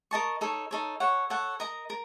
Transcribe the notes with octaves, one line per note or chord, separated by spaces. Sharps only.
A#4 D#5 A5 C#6
D#4 A4 C#5
D#4 A4 C#5
A4 C#5 F#5
A4 C#5 F#5
A#4 D#5 A#5
A#4